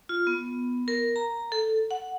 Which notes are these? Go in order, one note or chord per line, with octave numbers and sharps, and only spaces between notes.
F4
B3
A#4
A#5
A4
F#5